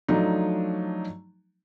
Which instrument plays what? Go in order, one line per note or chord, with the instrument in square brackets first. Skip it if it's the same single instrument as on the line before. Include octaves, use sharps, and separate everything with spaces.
[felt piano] F3 F#3 A3 D4 D#4